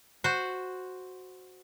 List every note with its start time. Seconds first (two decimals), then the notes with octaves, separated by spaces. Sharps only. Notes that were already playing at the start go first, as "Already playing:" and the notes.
0.24 F#4 C5